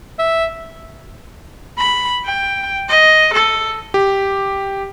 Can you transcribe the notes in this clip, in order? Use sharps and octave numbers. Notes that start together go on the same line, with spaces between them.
E5
B5
G5
D#5
A4
G4